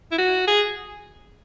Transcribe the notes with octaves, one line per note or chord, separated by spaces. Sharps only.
E4
F#4
G#4